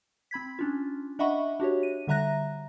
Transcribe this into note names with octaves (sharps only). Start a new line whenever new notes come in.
C4 B5 G#6 B6
C#4 D4 F4
D4 D#5 E5 F#5 B5 C#6
D4 F#4 G4 C#5
D#7
D3 G3 E5 A#5 F#6 A#6